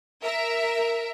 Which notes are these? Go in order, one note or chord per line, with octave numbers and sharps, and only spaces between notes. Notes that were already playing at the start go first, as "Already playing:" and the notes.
A#4 E5